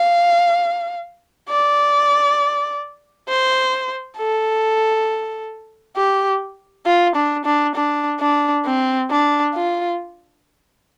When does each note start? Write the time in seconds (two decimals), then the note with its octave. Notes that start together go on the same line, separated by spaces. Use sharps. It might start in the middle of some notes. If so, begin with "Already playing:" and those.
Already playing: F5
1.49 D5
3.28 C5
4.18 A4
5.96 G4
6.86 F4
7.16 D4
7.45 D4
7.75 D4
8.20 D4
8.65 C4
9.11 D4
9.54 F4